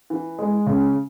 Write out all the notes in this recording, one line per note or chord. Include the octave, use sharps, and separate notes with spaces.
E3
G#3
C#3